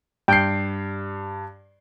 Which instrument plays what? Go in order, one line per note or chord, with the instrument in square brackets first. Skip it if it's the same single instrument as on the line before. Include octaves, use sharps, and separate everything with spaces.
[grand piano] G2 C7 [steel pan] G5